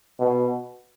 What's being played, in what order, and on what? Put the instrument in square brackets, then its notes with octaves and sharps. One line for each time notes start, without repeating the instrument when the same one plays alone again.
[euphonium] B2